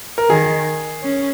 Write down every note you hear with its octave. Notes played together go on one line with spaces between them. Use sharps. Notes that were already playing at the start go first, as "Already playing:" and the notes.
A#4
D#3 G#4
C#4